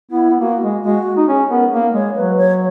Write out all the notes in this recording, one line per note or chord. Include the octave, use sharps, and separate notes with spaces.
B3 E4
B3
A#3 F#4
G#3
G#3 F#4
D#4
C#4 G#4
B3 A#4
A#3 A#4
G#3 C#5
F#3 B4
C#5